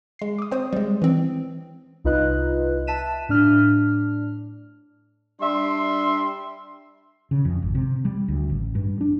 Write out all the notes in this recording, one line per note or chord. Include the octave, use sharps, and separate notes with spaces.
G#3 C7
D6 D#6
C4 C5 C#5 D#6
G3 G#3
E3 C4
C2 D#4 F4 B4 D#5 F#6
E5 A5 F#6 B6 D#7 E7
A2 D4 F6
G3 D4 E5 C6
C#3
F2
G#1
C3
G3
D2
A1
G2
D4